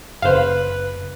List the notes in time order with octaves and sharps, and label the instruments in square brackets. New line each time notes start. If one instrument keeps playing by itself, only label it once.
[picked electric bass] F#1 C#3 [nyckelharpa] B4 [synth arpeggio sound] C5 F5